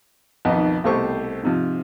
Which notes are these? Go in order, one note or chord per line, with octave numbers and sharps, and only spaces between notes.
B1 F2 D#3 B3 D#5
C2 B2 A3 G4 C5 C#6
G#2 C3 F3